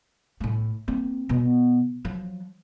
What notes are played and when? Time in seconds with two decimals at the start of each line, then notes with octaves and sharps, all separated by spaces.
0.40 A2 A3
0.88 A#3 C4
1.29 B2 B3
2.05 F3 F#3